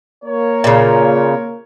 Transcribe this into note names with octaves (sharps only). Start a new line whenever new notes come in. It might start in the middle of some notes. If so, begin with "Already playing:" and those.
A#3 A#4 C#5
A#2 C#3